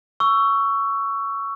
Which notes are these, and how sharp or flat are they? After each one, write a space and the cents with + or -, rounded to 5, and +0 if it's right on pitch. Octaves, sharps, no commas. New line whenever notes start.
C#6 +10 E6 +15